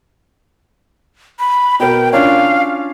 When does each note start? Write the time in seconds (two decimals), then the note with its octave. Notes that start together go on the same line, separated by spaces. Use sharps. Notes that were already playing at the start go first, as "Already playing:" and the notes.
1.39 B5
1.80 B2 A#4 G5
2.13 C#4 D4 F4 F5